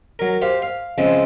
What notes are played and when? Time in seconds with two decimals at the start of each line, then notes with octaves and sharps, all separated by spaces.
0.19 F#3 A#4
0.42 G4 C5 F5
0.62 F5
0.98 C#3 F3 G#3 C4